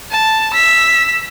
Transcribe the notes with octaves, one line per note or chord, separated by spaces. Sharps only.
A5
E6 B6